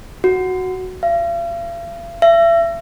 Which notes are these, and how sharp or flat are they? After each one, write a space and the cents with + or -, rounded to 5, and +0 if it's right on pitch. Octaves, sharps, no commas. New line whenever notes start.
F#4 +0
F5 -45
E5 +35